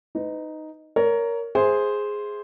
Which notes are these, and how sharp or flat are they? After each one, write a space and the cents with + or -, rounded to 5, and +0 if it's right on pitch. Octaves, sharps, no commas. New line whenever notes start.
D#4 +0 B4 +30
A#4 +0 C#5 +25
G#4 +0 C5 +0 E5 +0